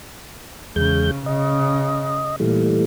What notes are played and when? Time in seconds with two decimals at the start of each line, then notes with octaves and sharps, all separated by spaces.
0.76 E2 C#3 G#3 G6
1.26 C#3 D#5
2.40 A#2 E3 G3 A3